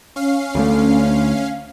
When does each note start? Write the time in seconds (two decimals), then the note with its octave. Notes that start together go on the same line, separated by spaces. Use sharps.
0.16 C#4 F5 C7
0.55 D2 G3 A3